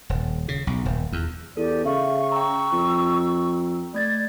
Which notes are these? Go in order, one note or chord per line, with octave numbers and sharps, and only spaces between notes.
D#1
C#3
B1
D#1
E2
E2 G4 A4 D5
C#3 E5 F5 C#6
G5 A#5 C#6 E6
F2
A3 D5 G#6 A6